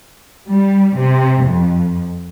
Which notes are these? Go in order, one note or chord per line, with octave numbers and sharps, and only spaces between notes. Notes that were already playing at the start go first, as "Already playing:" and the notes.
G3
C3
F2